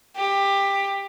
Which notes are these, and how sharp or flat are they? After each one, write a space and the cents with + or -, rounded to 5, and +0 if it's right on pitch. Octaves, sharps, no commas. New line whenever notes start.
G4 +15